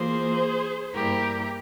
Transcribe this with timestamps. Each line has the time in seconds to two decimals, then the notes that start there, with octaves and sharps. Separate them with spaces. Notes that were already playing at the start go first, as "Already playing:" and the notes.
Already playing: E3 A#3 F4 G#4 C5
0.94 G2 G3 A#3 E4 G4 A#4